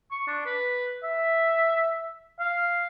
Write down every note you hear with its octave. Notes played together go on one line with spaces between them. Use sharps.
C#6
D4
B4
E5
F5